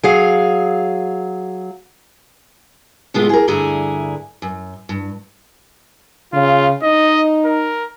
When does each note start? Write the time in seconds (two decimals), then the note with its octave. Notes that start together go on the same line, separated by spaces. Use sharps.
0.03 F#3 G#4 F5
3.14 A2 C3 G#3 B3 F4
3.29 G#4 A#4
3.48 D2 G2 D3 E4 G#4 A#5
4.42 F#2
4.89 G2
6.33 C#3 F4
6.83 D#4 D#5
7.45 A#4